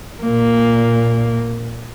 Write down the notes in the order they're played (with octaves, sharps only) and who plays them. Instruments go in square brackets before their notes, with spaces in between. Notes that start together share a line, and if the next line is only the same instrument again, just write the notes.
[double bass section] A#2 [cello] A#3